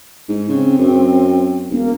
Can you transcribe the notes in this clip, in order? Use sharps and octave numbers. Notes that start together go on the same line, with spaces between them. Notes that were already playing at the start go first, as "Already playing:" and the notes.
G#2
C#3 C4
F#2
E1 A#3